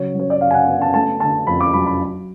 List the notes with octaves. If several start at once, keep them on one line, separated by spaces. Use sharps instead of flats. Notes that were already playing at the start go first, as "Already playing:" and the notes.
Already playing: C#3 F#3 C#5
F#3 C#5
D5
C#3 F5
G#5
F#5
B3
A5
A3 A5
D3 A5
F2 B5
D6
F#3 B5
B5